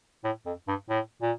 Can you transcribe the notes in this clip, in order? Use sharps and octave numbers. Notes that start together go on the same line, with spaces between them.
A2
F2
G2
A2
A#2